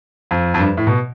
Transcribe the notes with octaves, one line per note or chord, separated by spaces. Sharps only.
F2
F2
G2
A2
B2